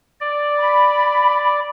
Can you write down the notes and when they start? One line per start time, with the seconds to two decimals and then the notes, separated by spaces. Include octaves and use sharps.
0.21 D5
0.59 B5